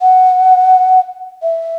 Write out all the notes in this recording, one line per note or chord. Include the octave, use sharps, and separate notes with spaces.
F#5
E5